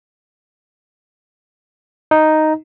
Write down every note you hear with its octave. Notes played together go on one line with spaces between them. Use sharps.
D#4